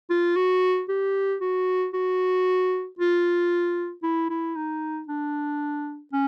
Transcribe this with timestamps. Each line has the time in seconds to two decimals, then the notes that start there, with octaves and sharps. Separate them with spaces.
0.10 F4
0.36 F#4
0.89 G4
1.41 F#4
1.93 F#4
2.98 F4
4.03 E4
4.30 E4
4.56 D#4
5.08 D4
6.13 C#4